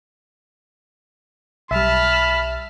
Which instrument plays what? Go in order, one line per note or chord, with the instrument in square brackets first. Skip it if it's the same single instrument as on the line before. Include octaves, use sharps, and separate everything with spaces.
[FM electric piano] B1 G3 [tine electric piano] E5 [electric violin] A5 F6 [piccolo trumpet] B5